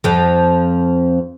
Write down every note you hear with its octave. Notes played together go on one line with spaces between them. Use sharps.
F2 F3